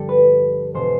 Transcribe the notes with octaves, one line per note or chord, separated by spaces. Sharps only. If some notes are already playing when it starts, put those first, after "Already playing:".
Already playing: G2 D3 F3 B3 G4 A4
B4
E1 B2 B3 C5